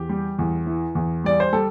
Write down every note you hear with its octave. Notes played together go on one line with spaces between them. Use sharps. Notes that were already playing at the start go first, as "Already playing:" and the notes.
Already playing: E2 G4
G3
E2
E3
E2
G3 D5
C5
G3 A4